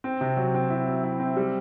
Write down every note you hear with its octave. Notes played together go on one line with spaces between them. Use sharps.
C4
C3
F#3
C4
E4
F#3
E4
C4
G3